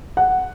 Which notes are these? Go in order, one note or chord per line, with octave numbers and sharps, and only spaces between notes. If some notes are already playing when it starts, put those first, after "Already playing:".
F#5